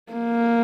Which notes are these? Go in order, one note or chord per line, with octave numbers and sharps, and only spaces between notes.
A#3